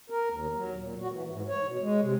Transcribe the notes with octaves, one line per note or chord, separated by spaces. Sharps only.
A#4
D#2
F#3
A#2
F#4
E3
G#2
C#5
B2
G#3
C3